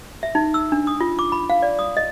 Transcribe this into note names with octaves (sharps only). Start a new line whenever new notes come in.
E5
D#4
E6
D4
D#6
F4
D6
B5
F5
D5
D#6
D#5